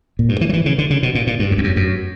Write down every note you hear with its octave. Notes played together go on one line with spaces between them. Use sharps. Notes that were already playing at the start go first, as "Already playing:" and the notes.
A#2
G2
E3
F#3
E3
C#3
D3
C#3
B2
A#2
A#2
G2
F#2
E2
F#2
F#2